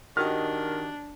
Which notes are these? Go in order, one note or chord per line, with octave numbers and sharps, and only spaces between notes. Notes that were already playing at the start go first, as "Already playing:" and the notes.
D#3 D4 F#4 G4 D#5 F6